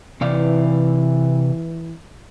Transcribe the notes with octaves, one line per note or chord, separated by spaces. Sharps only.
C3 E3 D5 F5